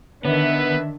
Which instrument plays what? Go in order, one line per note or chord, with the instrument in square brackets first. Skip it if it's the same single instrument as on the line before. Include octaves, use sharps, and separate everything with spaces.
[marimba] D3 [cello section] D#3 D4 E5 [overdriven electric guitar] B3 [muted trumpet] B4